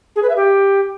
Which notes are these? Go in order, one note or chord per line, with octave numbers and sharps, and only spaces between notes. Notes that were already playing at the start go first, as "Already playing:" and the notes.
G#4
B4
E5
G4